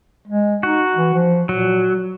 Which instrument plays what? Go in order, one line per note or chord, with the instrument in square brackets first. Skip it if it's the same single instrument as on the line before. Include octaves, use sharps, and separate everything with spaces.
[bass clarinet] G#3
[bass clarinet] D#4 [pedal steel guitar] F#4
[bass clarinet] E3
F3
[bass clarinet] A#2 [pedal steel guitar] F#3